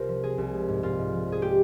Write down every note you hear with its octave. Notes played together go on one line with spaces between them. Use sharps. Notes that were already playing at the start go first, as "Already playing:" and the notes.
Already playing: C2 C3 F4 A#4 C5
F3
A#3 G#4
C2
G#3
G#2
G#2 F4
G#2
F3
G#2 G#4
G#3 G4